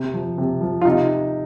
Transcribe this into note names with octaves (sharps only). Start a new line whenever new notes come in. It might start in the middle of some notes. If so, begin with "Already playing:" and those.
Already playing: C3
F3
C3
F3
F4
C3 D#4